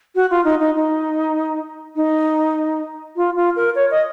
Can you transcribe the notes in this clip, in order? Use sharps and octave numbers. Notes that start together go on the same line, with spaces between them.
F#4
F4
D#4
D#4
D#4
D#4
F4
F4
A#4
C#5
D#5